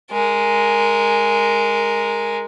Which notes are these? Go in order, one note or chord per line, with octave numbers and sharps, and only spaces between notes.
G#3 A#4